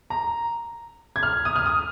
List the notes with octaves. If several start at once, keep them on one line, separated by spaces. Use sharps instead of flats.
A#5
G#6
F6
D#6
F6
D#6